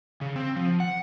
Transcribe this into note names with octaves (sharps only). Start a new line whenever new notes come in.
C#3
C4
F3
F#5